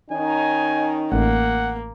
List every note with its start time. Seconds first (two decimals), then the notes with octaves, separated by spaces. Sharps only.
0.11 D#3 C#4 D#4 G#5
1.12 A1 A#3 F#5